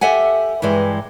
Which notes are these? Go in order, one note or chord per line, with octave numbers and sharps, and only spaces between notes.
G4 A4 E5 F#5 G#5
G2 E3 G3 G#3